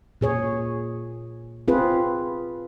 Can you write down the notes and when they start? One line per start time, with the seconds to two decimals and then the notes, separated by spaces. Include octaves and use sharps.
0.21 A#2 G#4 C#5
1.68 C4 F4 G#4 B4